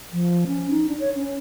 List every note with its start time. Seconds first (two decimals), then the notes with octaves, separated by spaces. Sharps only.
0.13 F3
0.47 C#4
0.70 D#4
0.89 D4
1.00 C#5
1.16 C#4